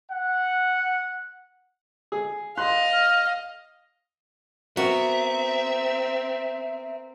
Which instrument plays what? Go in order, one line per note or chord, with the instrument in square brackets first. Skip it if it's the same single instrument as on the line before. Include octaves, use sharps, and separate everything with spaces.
[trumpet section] F#5
[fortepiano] G#4
[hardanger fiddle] D#5 F5 [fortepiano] C6 F#6
[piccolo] F6
[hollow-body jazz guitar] B3 F#4 [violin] C4 [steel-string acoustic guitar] A#4 [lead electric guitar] E5